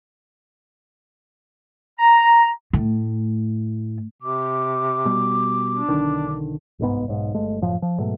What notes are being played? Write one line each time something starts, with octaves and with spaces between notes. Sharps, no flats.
A#5
A2
C3 D6
B2 G3
D4
B1 D3 D#3
G1 C2 G#2 B3
B1 G#2
G1 G#3 A3
F#1 F#2 A2 F3
F3
G#2 B2 F#3 A3